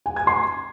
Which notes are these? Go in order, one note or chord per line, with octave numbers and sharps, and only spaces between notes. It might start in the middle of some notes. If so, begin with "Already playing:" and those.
G#5
G#6
C6